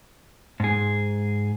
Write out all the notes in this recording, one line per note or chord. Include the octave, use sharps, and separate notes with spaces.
G#2 G#4